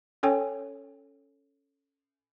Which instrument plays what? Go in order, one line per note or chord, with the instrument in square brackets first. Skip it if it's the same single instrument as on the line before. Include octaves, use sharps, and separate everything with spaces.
[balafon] C#4 A4 C#5 G5 G#5